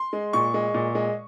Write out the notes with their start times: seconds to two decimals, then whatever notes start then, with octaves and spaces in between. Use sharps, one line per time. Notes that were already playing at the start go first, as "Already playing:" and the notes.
Already playing: C6
0.13 G#3
0.33 A#2 C#6
0.54 G#3
0.74 A#2
0.95 G#3